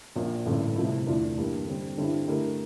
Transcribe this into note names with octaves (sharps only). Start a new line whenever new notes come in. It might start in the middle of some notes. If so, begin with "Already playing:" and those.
A#1 A#2 F3 A#3
A1 G2 D3
C2 C3 F3 A3 E4
E2 D3 A3 D4 F4
G2 E3 G3 A#3
D3 G3 C4
G2 D3 G3 C4 E4
D3 A3 E4 G4 A#4